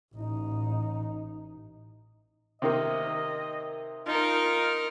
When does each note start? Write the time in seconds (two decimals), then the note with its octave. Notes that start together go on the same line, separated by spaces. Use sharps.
0.15 A1 D#4
2.62 C3 D#3 A#3 D#5
4.07 D#4 F4 A#4